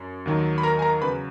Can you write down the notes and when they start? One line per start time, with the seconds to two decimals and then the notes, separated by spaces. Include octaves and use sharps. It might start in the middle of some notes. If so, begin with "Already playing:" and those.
Already playing: F#2
0.26 D#2 D#3 F#3
0.58 B5
0.63 A#4 A#5
0.79 G#5
0.82 A#4 A#5
1.01 E2 C#3 F#3 B4 B5